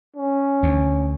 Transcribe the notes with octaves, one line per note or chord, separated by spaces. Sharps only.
C#4
D2